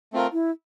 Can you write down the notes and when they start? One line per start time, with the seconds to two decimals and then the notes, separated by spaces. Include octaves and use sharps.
0.13 A3 C4 F4 A#4
0.33 E4